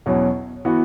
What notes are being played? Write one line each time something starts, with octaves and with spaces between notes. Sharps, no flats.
E2 B2 F#3 C#4
E3 B3 F#4